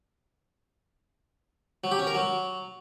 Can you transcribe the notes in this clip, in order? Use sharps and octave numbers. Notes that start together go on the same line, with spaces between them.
F#3
G4
C#4
A#4
F#3